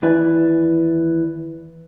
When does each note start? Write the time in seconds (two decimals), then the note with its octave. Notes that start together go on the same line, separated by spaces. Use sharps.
0.02 D#2 E3 E4 B4 D5 G#5